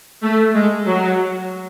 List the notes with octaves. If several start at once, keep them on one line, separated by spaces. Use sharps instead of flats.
A3
G#3
F#3